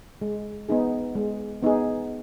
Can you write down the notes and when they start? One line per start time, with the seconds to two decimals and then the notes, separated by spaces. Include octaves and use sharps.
0.22 G#3
0.69 B3 D#4 G#4
1.15 G#3
1.62 B3 D#4 G#4